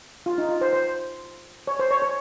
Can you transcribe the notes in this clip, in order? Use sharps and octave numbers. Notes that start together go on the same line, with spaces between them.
F4
D#4
F4
C5
C5
C#5
C5
C#5
C#5